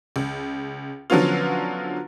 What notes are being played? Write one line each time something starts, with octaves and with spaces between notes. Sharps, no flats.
C#2
D3 F3 F#3 B3 C#4 F4